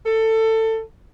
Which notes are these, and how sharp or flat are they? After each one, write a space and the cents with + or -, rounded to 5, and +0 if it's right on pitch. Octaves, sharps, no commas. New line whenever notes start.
A4 +20